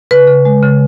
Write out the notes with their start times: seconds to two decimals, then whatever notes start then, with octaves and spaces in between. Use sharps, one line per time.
0.11 C#3 B4
0.28 C#3
0.45 G#3
0.63 C#3